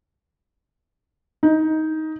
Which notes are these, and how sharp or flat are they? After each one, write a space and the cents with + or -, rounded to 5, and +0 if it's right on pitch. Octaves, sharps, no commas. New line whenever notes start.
D#4 +15